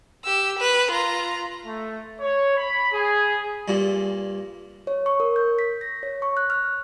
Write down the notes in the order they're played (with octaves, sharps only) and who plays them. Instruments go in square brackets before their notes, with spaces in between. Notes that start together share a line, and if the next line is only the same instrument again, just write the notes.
[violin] G4 E6
B4
F4 A#5
[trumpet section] A3
C#5
B5
G#4
[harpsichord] G2 A#2
[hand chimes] C#5
C#6
A#4
G6
B6
A#6
C#5
C#6
F#6
F6